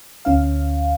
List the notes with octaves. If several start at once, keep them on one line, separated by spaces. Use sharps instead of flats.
D2 C#4 F5